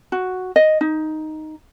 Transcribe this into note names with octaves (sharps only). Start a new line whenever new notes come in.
F#4
D#5
D#4